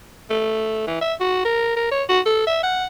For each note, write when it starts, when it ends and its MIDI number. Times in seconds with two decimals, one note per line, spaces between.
0.30 0.84 57
0.87 1.00 52
1.01 1.14 76
1.20 1.43 66
1.45 1.74 70
1.76 1.89 70
1.92 2.03 73
2.09 2.20 66
2.26 2.42 69
2.47 2.59 76
2.63 2.86 78